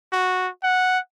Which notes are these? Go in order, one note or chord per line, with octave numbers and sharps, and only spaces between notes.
F#4
F#5